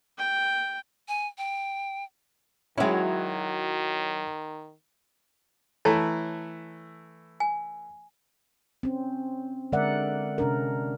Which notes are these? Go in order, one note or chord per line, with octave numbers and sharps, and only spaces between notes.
G5
G#5
G5
D#3 F#3 G#3 C#4 E4
E3 A3 E4 C#5 A5 A#5
G#5
C4 C#4
D3 G#3 A#4 D5 E5 F#5
C3 C#4 D4 A#4